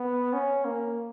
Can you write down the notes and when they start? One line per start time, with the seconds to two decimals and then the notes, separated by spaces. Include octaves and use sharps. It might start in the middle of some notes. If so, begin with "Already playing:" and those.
Already playing: B3
0.33 C#4
0.65 A#3